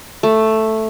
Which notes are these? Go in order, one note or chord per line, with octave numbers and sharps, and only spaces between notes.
A3